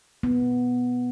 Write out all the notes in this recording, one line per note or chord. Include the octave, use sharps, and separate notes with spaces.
B3